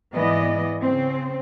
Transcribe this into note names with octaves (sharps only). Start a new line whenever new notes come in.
G#2 E3 B3 D5 D#5
C#3 C4